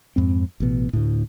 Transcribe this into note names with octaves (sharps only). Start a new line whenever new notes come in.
F2 G#2 C4
A1 B2
D2 A2